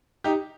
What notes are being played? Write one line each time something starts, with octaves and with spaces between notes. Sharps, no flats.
D#4 G4